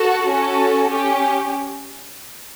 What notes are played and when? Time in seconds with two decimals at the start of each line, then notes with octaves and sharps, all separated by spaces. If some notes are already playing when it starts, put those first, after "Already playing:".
Already playing: F#4 A4
0.28 C#4 F#4 A4
0.89 C#4 G4